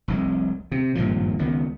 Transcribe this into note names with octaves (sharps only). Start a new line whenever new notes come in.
F1 C2 G#3
C3
G#1 G2 A#2 F3
C#2 D#3 B3